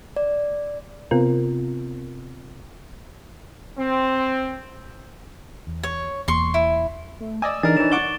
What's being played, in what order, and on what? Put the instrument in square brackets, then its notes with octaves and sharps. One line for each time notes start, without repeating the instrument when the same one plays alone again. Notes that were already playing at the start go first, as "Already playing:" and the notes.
[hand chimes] D5
[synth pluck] C3 B3 C4 F4 A#4
[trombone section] C4
[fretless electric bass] E2
[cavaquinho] C#5
[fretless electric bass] E1 E2 A#3 [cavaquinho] C6 C#6
[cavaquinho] E4
[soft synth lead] A3
[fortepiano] D5 D#5 G#5 [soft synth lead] E6 [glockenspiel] E7
[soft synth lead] E3 [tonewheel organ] D4 D#4 [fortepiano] G#4 A#4 [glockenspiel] A6
[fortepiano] E3 A#4 [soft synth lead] C#5 [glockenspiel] E7
[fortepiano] D5 F#5 D6 [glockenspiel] C#6 D7 G7